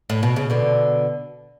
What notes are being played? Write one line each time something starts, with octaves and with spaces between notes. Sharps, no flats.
A2
B2
C#3
B2 D3